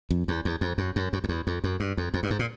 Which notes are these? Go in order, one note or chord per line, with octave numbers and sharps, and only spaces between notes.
F2
E2
E2
F2
F#2
F#2
F#2
F2
E2
F2
F#2
G2
F2
F2
G2
G#2
A#2